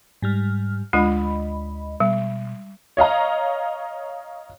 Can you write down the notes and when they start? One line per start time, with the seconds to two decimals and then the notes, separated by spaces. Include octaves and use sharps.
0.22 G#2 G3 F6
0.93 D2 G#3 D4 F4 D#5 B5
2.00 B2 G3
2.97 C#5 D#5 F5 A#5